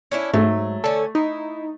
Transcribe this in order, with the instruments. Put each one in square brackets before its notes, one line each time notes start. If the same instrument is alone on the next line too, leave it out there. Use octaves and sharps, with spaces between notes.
[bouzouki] C#4 D4 E4
[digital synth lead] G#2 [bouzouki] F#3 [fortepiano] A3
[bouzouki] D3 C#4 [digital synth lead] A4
[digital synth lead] D#4 [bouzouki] E4